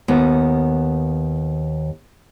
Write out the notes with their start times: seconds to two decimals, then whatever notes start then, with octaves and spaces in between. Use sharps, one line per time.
0.08 D#2 B3